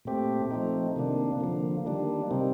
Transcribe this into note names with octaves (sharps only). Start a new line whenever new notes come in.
A#2 A3 C4 G4
F3 A3 C4 D#4
C3 D#3 A#3 D4
D3 F3 A#3
D#3 G3 A#3 D4
C3 G3 C4 D#4